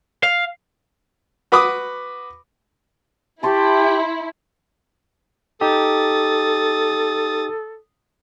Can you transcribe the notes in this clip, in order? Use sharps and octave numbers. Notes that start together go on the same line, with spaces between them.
F5
F#4 B4 B5 D6 D#6
E4 G4 A5 C6 C#6
D#4 G4 A4 D#6 A6